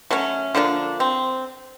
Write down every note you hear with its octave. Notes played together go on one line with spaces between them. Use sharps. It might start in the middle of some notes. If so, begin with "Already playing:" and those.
F#3 A3 C#4
D3 F3 A#3 D4
C4